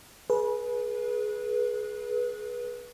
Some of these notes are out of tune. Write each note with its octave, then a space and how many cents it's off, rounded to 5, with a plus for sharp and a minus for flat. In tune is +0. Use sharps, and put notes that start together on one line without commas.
G#4 +25 B4 -25